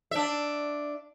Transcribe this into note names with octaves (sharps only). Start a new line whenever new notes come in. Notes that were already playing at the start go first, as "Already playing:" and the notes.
D4 E5